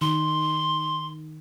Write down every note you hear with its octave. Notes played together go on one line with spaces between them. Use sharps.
D#3 C6